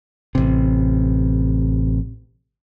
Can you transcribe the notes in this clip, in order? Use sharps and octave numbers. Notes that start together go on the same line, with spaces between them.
A1 C3